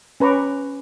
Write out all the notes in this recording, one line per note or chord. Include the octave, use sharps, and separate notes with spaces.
C#4 B4 A#5 C#6 D6